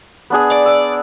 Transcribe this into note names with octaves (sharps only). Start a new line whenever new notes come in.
B3 D4 G#4
D5
E6